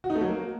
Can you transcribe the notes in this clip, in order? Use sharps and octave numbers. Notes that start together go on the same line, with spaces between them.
F#4
D#4
A3
F#3
A#3